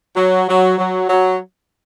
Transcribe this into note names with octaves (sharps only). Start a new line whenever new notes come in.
F#3
F#3
F#3
F#3